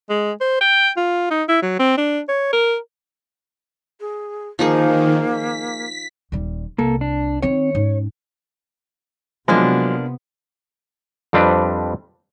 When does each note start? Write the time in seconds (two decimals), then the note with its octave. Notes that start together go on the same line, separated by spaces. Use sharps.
0.10 G#3
0.41 C5
0.61 G5
0.97 F4
1.31 D#4
1.48 E4
1.62 F#3
1.79 C4
1.97 D4
2.28 C#5
2.53 A#4
4.00 G#4
4.59 D#3 F3 A#3 D#4 G#4
5.28 B6
6.32 D#1 G3
6.78 C2 A#3 A4
7.01 D4
7.42 D#3 C4 C#5
7.75 G#2 C#4
9.48 C3 F3 F#3 G#3 A#3 B3 D4 E4
11.33 F2 G3 C4 D4 B4